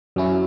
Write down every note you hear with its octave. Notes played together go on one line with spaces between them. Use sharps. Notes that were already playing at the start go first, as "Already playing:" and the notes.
F#2 F#3 C#4 E4